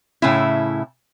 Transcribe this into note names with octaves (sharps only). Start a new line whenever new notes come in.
A2 C#3 E4